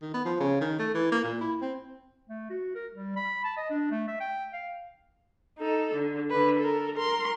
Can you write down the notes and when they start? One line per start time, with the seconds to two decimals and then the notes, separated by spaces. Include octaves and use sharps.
0.02 D#3
0.13 B3
0.25 F3
0.40 C#3
0.61 D#3
0.79 A3
0.94 E3
1.12 A#3
1.24 A#2
1.40 E4
1.61 C4
2.29 A3
2.50 F#4
2.75 A#4
2.93 G3
3.16 B5
3.44 A5
3.57 D#5
3.70 D4
3.91 A3
4.08 E5
4.20 G5
4.53 F5
5.58 D#4 A4
5.95 D3
6.30 D3 B4
6.59 A4 A#4
6.95 A#4 C6